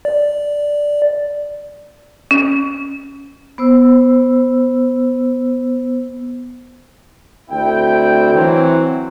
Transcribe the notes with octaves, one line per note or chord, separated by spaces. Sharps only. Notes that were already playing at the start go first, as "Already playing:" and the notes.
D5
C#4
B3 C5 E6
D2 C4 E4 G5
E3 F#3 C4